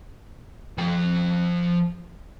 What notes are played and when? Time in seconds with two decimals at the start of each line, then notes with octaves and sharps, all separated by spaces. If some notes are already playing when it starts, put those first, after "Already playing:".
0.78 F3 G5